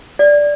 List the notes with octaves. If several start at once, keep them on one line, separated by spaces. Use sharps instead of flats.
D5